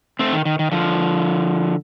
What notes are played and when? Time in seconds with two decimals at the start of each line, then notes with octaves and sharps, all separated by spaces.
0.19 A3 C4
0.33 D#3
0.45 D#3
0.59 D#3
0.72 D3 F3